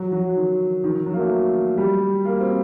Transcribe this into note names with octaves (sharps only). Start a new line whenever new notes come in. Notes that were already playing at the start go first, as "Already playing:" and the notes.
Already playing: F#3
F#3
D#3
D#3
D#3
F#3
A#3
A3
G3
A#3
C4